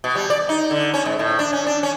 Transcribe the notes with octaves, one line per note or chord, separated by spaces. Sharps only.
B2
G3
D5
D#4
D3
C#4
G#2
A2
D4
C#4
D4
C#4